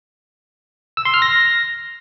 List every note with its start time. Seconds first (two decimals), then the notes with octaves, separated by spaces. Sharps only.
0.97 E6
1.05 C6
1.14 F6
1.22 A#6